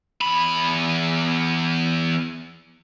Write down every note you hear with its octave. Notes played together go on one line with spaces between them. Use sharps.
E2 B5